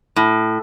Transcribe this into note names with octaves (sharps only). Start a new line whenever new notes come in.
A2